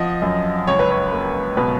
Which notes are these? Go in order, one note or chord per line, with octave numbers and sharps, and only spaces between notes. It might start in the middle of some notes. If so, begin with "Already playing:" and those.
Already playing: F3 D#5 F#5
F#2
C#2 C#5
B4
C#5
A#3
B2 B4